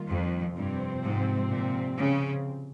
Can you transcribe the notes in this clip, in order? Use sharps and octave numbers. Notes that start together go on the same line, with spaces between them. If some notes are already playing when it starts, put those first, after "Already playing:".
Already playing: D#3 G3 A#3 F4
F2
G2 C3 F3 C4
G#2
A#2
C#3